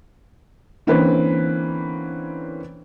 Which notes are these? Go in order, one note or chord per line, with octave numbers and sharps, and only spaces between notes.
D3 E3 A#3 C4 C#4 B4